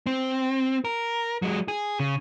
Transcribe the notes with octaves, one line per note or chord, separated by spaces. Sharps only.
C4
A#4
F#3 G#3
G#4
C#3